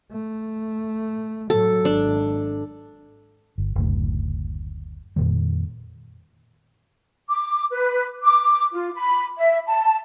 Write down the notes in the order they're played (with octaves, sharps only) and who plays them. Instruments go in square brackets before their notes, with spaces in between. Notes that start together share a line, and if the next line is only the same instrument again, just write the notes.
[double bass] A3
[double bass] A2 F#3 [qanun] A4
[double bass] G#1 [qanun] D4
[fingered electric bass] G1
F#1 D2 A2
F2 A#2 D#3 G3
[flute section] D6
B4
D6
F4
B5
E5
A5